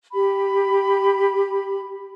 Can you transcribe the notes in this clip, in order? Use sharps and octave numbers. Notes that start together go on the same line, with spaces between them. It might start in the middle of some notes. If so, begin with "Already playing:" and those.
G4 B5